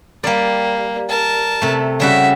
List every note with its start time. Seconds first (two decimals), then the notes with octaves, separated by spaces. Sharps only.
0.24 G3 A#3 D5
1.09 A#4 A5
1.62 C3 A3
2.00 C#3 G3 F#4 E5